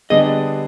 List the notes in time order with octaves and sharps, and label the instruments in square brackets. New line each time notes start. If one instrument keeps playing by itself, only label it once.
[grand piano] D3 G3 B3 D4 G#4 [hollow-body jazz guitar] D#5